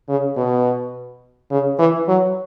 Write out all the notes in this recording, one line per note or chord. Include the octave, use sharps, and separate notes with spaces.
C#3
B2
C#3
E3
F#3